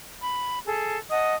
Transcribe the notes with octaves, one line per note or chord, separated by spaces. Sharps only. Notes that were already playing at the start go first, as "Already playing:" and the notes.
B5
G#4 A4
D#5 F#5 A5 D#6